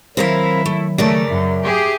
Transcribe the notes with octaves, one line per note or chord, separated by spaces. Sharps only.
D#3 F#3 C4 E4 A#4 F5
A3
C#3 A3 A#4 D5
F#2 E5
G4 G#4